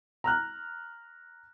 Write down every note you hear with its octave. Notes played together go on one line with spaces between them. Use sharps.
A#5 F6 F#6